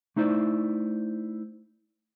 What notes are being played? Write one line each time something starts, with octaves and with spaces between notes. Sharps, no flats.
A3 D#4 E4 C5 D5